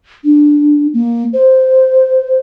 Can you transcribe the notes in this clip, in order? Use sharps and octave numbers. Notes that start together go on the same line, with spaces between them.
D4
A#3
C5